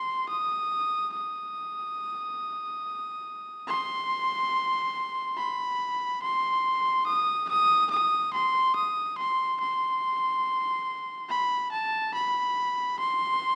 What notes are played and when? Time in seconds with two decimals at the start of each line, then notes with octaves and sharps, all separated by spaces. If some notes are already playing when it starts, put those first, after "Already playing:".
Already playing: C6
0.29 D#6
1.14 D#6
3.68 C6
5.37 B5
6.23 C6
7.07 D#6
7.49 D#6
7.91 D#6
8.33 C6
8.76 D#6
9.18 C6
9.61 C6
11.30 B5
11.72 A5
12.14 B5
12.99 C6